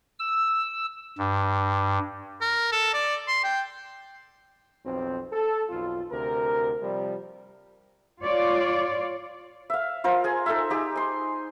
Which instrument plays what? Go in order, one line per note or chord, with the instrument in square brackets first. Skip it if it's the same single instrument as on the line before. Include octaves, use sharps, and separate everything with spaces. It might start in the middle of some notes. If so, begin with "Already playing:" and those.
[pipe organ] E6
G2
[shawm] A#4
A4
D5
C6
G5
[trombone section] B1 F2 C4
A4
B1 F2 F4
D2 C3 A#4
C3 F3 G3
[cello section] F4 C#5 D5
[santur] E5 F5
F4 A#4 C5
G#4 G#5
D#4 A4 E5
D#4 G4 G#4
G#5 C6